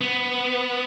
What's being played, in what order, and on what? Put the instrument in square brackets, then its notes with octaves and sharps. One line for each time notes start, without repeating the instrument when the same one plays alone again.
[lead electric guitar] B3